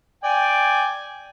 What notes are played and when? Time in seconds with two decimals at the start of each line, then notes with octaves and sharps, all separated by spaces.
0.24 D5 G5 G#5